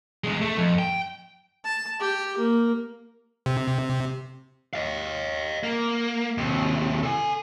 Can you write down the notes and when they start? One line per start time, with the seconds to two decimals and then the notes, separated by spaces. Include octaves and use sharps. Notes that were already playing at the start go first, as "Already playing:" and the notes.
0.24 E2 G#3
0.41 A3
0.57 F2
0.79 G5
1.65 A5
2.00 G4
2.37 A#3
3.46 C3
4.73 D#5 F5
5.63 A#3
6.38 D#2 C3
7.03 A4 G#5